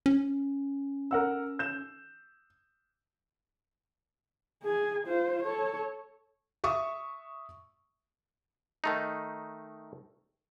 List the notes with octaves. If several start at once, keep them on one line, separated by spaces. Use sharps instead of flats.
C#4
A#4 F#5 E6
G6 E7
G#4 G#5
F4 C5
A4 C#5
E5 C#6 D#6
D#3 A3 D#4